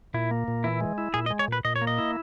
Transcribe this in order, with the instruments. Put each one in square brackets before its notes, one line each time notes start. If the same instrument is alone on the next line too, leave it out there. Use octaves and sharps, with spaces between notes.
[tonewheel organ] A#2 [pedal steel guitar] E4
[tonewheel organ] A#3
A#2
[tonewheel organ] E3 [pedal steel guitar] E4
[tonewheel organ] G#3
E4
[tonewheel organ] A#2 [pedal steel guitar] G#4
[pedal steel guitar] D#5
[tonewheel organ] G#3
[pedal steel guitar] C#5
[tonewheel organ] A#2 [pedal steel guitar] B4
[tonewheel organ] A#2 [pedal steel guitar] D#5
[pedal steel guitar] C#5
[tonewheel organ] A#3
[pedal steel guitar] D#5
[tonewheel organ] E4